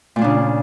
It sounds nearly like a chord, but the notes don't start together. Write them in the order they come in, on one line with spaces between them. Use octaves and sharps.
A#2 A#3 D4 C#3